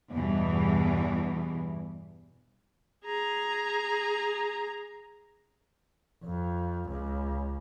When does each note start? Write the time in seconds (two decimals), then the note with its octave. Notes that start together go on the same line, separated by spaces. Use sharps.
0.12 E2 G2 B2 E3
3.05 G#4 A#5
6.24 F2
6.89 C#2